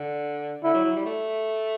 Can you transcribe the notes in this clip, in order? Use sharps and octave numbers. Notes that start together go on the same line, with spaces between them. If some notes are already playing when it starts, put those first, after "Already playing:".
Already playing: D3
D3 E4
F#3
F#3
G3
A3